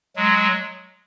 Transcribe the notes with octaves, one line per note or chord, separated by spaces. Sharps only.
F#3 G#3